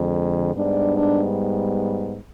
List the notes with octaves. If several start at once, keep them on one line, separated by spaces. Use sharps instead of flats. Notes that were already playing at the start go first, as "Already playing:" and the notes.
Already playing: F2 D3 G#3
G#2 G3 B3 D4
D4